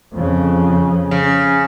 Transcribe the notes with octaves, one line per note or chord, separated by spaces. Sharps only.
F2 C#3
C#3